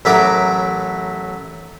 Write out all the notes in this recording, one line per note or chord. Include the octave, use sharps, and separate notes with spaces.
A1 F#3 A3 A#4 B5 D6